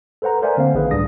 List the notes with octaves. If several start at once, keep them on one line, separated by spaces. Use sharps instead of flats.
A4 B4 C5 F#5 A#5
A#4 C5 D5 E5 F#5 G#5
D3 A#3 C4 F5
A#1 D#3 G#4 B4
C#2 A2 G3 D4 D#6 A#6